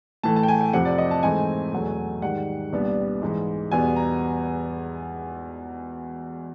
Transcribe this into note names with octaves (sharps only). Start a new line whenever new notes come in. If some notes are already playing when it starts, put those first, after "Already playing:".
A2 E3 A3 A5
A5
G5
G#5
G5
F2 C3 F3 F#5
D5
D#5
A5
G#2 E3 A3 C4 D#4 G#5
E2 B2 F#3 A3
G#2 D#3 G3 F#5
C2 A#2 G3 B3 D4
G#2 E3 G#3
E2 B2 G3 B3 G#5
A#5